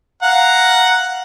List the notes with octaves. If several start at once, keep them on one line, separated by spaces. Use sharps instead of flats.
F5 F#5 A#5